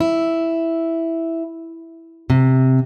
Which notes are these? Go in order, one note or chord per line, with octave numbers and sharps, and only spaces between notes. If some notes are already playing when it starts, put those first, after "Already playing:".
E4
C3